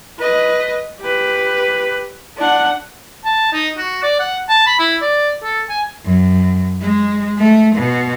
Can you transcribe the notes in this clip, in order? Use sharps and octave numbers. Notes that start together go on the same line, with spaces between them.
B4 D#5
G4 B4
D4 F#5
A5
D#4
F#4
D5
F#5
A5
B5
E4
D5
A4
G#5
F#2
G#3
A3
B2